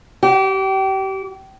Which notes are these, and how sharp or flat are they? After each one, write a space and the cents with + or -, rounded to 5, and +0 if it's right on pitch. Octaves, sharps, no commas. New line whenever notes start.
G4 -30